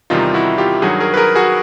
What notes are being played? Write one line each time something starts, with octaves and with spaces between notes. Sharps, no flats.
E2 C3 D#3 G3 D#4 F4
E4 F#4
F4 G4
G2 D#3 F#3 F#4 G#4
G#4 A#4
B4
G#4 A#4
F#4 G#4